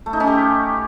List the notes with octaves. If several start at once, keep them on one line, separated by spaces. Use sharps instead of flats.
A3
D#4
C#4
G4